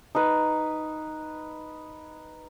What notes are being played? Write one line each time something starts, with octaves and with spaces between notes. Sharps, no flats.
D#4 B4